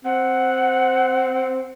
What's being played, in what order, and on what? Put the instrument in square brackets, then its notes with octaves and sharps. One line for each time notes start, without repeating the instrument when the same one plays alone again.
[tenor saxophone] C4 [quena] F#5